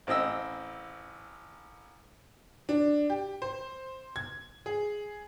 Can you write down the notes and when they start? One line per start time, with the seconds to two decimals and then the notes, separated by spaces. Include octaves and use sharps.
0.07 A1 C4 E4 D#5 E6
2.69 D4
3.10 G4
3.42 C5
4.16 G#6
4.66 G#4